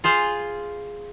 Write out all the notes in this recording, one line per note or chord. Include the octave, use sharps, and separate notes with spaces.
F4 G#4 C5 F5